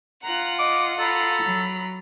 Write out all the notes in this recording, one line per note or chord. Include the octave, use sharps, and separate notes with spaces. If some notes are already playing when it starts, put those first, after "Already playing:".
F4 F#5 A#5 F#6
D#5 D6
A4 A#5 B5
F#3